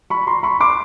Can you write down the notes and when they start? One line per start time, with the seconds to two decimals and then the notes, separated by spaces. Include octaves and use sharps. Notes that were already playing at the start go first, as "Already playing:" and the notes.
0.10 B5 C#6
0.27 A#5 C6
0.43 B5 C#6
0.60 C6 D6